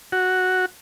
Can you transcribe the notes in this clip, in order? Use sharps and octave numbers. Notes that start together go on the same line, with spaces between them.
F#4